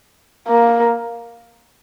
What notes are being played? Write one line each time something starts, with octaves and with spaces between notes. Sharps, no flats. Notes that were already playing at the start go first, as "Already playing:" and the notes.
A#3